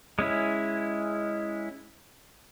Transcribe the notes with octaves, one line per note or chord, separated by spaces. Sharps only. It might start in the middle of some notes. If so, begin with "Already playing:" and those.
G#3 C#4 E4